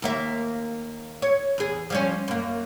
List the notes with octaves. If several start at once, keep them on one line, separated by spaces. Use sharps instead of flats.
D#2 A#3 E5
C#5
E2 G#4
F3 G3 C#4
F#2 A#3